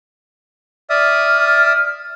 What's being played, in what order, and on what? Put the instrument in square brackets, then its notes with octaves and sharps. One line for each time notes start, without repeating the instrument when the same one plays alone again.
[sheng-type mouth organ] D5 E5 D#6 [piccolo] F6